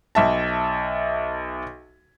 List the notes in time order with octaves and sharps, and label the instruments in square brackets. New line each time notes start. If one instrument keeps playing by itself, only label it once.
[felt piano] B1 E5 A5